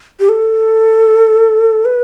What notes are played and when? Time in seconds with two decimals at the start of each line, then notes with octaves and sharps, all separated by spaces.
0.20 G4
0.29 A4
1.85 B4